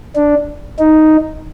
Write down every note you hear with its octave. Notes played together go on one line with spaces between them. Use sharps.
D4
D#4